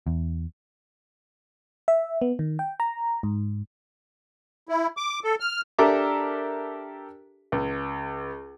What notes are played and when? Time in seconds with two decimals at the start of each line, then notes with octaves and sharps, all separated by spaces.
0.07 E2
1.88 E5
2.21 B3
2.39 D#3
2.59 G5
2.80 A#5
3.23 G#2
4.69 E4
4.97 D6
5.24 A4
5.40 F6
5.79 D4 G4 A4 A#4 E5 D6
7.52 C#2